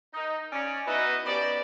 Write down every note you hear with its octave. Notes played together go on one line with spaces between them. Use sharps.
D#4
C#4 D5
B3 D#4 E4 F#4 B4 D#5
B3 C#4 G4 C5 D5